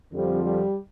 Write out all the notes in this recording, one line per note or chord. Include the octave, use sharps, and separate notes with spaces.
F2 D3 F3 G3
G3